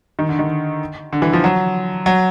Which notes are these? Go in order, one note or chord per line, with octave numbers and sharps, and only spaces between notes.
D#3
D3
D#3
D3
E3
F3
F#3
F#3